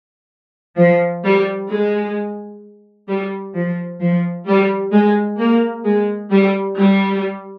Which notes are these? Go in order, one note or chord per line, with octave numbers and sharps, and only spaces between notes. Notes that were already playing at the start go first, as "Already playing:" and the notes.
F3
G3
G#3
G3
F3
F3
G3
G#3
A#3
G#3
G3
G3